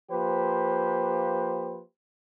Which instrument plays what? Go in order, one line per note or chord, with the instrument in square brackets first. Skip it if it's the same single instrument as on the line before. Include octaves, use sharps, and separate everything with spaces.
[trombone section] F3 A#3 G4 B4 C5